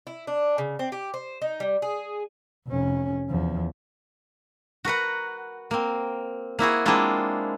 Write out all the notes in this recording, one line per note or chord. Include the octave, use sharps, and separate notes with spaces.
E4
D4
C#3
C4
G4
C5
D#4
G3
G#4
F1 C#4
E2 F3
F#4 A#4 B4 F#5
A#3 C4
A#3 E4 F#4 G#4
G#3 A#3 C4 D4 E4 F4